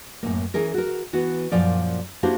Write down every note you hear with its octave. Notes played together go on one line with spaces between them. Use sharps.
F#2 A2 A#3
E3 C#4 G#4 A#4
F#4 A#4
E3 B3 F#4
F#2 A#2 F3 D5
A#3 D4 E4 F#4 G4 C5